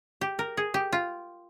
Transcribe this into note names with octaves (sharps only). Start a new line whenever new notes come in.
G4
A#4
G#4
G4
F4